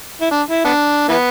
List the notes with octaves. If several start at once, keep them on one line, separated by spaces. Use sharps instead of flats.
E4
D4
E4
B3 D4
E3 B3